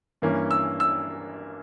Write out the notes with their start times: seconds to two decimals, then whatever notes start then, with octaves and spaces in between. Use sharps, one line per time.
0.22 G2 E3 A#3 C#4
0.51 E6
0.80 E6